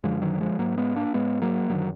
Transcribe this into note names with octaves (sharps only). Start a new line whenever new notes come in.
F#2 D3 F3 G#3
D#3 F#3
F3 G#3
G#2 F#3 A#3
G#3 B3
A#3 D4
G#2 G#3 B3
F#3 A#3
F#2 D3 D#3 F#3